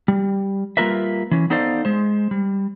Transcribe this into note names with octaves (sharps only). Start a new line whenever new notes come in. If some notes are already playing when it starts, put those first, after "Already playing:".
G3
G3 A#3 F4 A#4 B4 E5
E3 C#4
B3 D#4 A4 C5 D5 F5
G#3 C5
G3